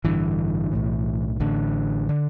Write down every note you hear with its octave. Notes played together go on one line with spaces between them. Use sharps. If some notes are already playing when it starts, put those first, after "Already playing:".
A1 G2 D3 E3
B1 A2
A1 A2 D3
D3